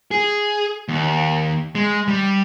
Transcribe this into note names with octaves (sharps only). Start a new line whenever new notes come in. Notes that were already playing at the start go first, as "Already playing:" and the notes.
G#4
D#2
G#3
G3